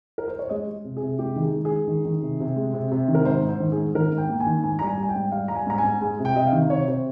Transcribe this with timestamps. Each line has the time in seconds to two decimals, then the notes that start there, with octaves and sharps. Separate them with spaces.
0.18 A#4
0.28 C5
0.39 C#5
0.49 G#3 D#5
0.68 G#3
0.84 C3
0.97 G#4
1.02 C3
1.19 G#3 G4
1.36 D#3
1.42 G#4
1.53 G#3
1.65 G#4
1.71 G#3
1.87 D#3
2.05 D#3
2.22 C3
2.40 C3
2.56 G#3
2.73 C3
2.91 C3
3.08 D#3
3.15 A#4
3.25 G#2 C5
3.43 G#2
3.49 C5
3.60 D#3
3.72 G#4
3.77 G#2
3.95 D#3 A#4
4.12 G#2
4.18 G5
4.29 A#3
4.40 G#5
4.46 D#3
4.63 G#2 G#5
4.79 G3 A#5
4.87 G#5
4.97 G3
5.03 G#5
5.09 G5
5.15 G#2
5.32 G3 F5
5.48 G3 A#5
5.55 G#5
5.66 G#2 A#5
5.78 G#5
5.84 G#2
6.01 G#3 G#5
6.19 C3
6.25 G5
6.36 C3 D#5
6.47 F5
6.53 D#3
6.70 C3 C#5
6.88 C3 C5